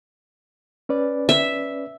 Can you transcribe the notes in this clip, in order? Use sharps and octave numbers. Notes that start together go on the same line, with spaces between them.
C#4 B4 D5
E5